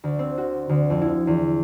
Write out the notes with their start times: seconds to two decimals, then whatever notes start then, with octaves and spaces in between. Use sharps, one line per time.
0.04 D2
0.19 C4
0.38 F#4
0.69 D2
0.90 F2
1.02 E4
1.27 E2